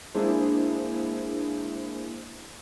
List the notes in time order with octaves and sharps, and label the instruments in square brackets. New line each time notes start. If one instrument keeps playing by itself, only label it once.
[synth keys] G#3 A#3 D4 E4 G#4 C5